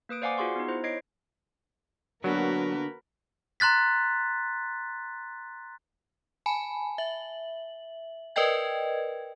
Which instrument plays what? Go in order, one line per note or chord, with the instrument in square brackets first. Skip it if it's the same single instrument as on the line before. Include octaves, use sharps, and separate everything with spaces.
[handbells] A#3 B4 D#6 D7
C5 D5 F5 F#5 G#5 D6
F4 F#4 G#4 F#5 C6 C#6
B3 D#4
E4 C5
C#5 D#5 G#6 C7 D7
[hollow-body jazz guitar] D3 B3 D4 [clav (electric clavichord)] F#3 [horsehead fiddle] A#3 F#4 [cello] A#4 B4
[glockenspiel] A#5 C6 F#6 A6 B6
[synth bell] G#5 A5 B5
E5 F#7
A#4 B4 D5 D#5 G5 G#6